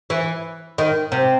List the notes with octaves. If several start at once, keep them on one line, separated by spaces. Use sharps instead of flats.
E3
D#3
C3